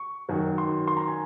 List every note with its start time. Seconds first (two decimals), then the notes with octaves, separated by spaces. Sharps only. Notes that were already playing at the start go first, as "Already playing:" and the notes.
Already playing: C#6
0.29 F#2 D#3 F#3
0.58 C6
0.87 C6
0.97 A#5
1.08 G#5